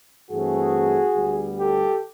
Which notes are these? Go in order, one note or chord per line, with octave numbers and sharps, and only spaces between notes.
G2 E3 A3 C4 F#4 G#4
D2 D3 G3 B3
G4 A4